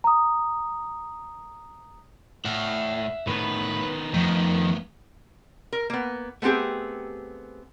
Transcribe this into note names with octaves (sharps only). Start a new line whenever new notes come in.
A#5 D#6
A2 E5 F#5
A2 D#3 B3 B4
F2 D#3 A3 B3
A#4
A#3 B3
A3 B3 C4 G4 G#4